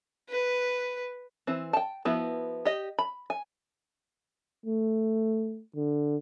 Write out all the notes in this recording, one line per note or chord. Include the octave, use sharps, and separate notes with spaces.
B4
E3 C4
G5 A5
F3 B3 E4 F#4
G4 D#5
B5
G#5
A3
D3